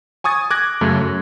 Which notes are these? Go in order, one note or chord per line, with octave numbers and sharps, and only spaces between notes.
G#5 C#6 D#6 G#6 A6
D6 F#6 G#6 A#6
F#2 C#3 A3
F#2